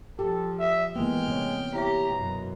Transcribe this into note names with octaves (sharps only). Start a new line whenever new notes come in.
F3 G4 A4
G4 E5
E3 G#3 A#3 B3 G5 F6
C3 C#5
E4 G4 C#5 E5 A#5
F#2 B2